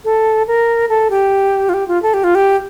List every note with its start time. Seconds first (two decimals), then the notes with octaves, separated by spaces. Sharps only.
0.05 A4
0.47 A#4
0.89 A4
1.10 G4
1.69 F4
1.74 G4
1.88 F4
2.02 A4
2.14 G4
2.24 F4
2.35 G4